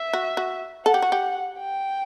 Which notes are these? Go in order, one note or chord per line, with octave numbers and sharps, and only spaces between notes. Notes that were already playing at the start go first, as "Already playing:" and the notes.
Already playing: E5
F#4
F#4
A4 F#5
G4
F#4
G4
G5